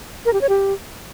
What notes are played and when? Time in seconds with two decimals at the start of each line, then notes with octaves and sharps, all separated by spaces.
0.25 A#4
0.33 G4
0.41 C#5
0.49 G4